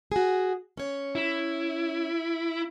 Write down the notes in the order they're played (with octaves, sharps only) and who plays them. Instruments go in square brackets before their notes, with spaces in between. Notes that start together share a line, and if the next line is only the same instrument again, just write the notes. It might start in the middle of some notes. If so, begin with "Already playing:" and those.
[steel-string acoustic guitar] F#4 G#4
C#4 C#5
[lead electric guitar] E4